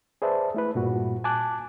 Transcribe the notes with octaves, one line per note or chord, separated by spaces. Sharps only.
G#4 B4 C5 D5 E5 A5
A3 E4 B4
G2 A#2 F#4
G#5 A5 D6 F#6